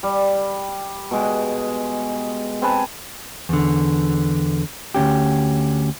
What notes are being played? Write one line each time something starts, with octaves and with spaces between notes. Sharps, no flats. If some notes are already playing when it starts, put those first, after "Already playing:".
G3
B2 G#3
C4 B4 G#5 A5
E2 D3
D2 G2 C#4 G4